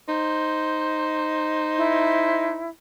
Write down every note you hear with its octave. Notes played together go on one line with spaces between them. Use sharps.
D#4 C5
E4